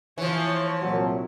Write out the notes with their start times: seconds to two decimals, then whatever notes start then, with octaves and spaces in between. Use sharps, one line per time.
0.18 E3 F3 C#5
0.82 C2 A#2 F#3